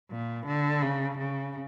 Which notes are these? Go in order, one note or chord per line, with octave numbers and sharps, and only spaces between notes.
A#2
D3
C#3
C#3